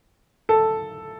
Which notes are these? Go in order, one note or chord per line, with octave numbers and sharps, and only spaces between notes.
A4